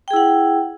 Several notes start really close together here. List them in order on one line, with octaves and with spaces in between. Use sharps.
G5 G#4 E4 F#5